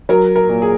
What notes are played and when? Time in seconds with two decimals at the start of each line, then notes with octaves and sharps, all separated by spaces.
0.09 F#3 A#4
0.36 A#4
0.49 A#2
0.62 G#4